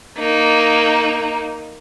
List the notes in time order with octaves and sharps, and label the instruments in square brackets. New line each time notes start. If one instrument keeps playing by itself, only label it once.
[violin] A#3 D#4